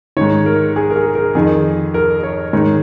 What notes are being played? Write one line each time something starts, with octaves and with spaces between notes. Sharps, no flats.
G#2 D#3 C#5
A#4
G#4
A#4
G#4
A#4
F2 D#3 G#4
A#4
C#5
G#2 D#3 C#5